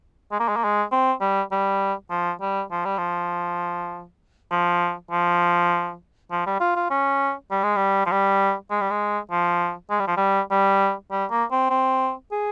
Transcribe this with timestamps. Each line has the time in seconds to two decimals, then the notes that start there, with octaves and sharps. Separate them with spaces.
0.31 G#3
0.39 A#3
0.48 G#3
0.56 A#3
0.64 G#3
0.91 C4
1.21 G3
1.51 G3
2.10 F3
2.41 G3
2.71 F3
2.85 G3
2.98 F3
4.51 F3
5.11 F3
6.31 F3
6.46 G3
6.60 F4
6.76 F4
6.90 C#4
7.51 G3
7.63 G#3
7.76 G3
8.06 F3
8.11 G3
8.70 G#3
8.81 G3
8.91 G#3
9.31 F3
9.90 G#3
9.99 G3
10.07 F3
10.17 G3
10.51 G3
11.11 G3
11.30 A#3
11.51 C4
11.70 C4
12.31 G#4